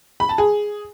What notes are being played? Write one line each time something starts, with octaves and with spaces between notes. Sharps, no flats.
B5
A5
G#4